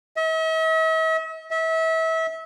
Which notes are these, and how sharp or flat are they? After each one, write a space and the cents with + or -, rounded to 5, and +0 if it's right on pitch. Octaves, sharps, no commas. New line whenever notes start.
E5 -45
E5 -30